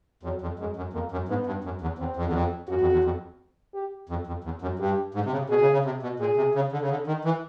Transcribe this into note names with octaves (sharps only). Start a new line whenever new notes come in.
F2 F#3
F2
F#2 G#3
F#2
F2 A#3
F#2
G#2 B3
G2
F#2
E2
E2 C4
F2
E2
F2
F#2 F#4
F2
E2
F2
G4
F2
F2
E2
F#2
G2 G4
G#2
C3
C#3
B2 G#4
C#3
C#3
C3
B2
A#2 G#4
C3
C#3
D3
C#3
D3
D#3
E3